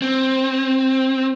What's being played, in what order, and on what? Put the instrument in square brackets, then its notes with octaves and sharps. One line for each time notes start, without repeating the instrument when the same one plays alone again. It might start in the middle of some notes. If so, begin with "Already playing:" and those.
[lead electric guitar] C4